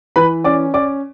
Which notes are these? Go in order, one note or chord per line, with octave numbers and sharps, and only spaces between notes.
E3 B4 B5
C#4 D5 D6
C#4 D5 D6